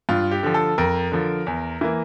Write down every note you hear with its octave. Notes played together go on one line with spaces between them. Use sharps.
G2 F4
G4
D3 F3
A4
F2 A#4
D3 F3
E2
E3 A#3